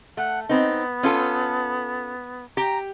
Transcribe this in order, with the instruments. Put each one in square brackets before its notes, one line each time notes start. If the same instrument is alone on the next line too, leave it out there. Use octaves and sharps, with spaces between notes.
[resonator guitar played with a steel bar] A3 [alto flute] F#5
[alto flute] B3 [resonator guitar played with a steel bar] C4 D#4
[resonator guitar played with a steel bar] C#4 F4 A4
[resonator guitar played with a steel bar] G4 G5 [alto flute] A#5